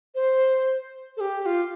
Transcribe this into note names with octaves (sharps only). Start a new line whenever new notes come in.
C5
A4
G4
G4
F4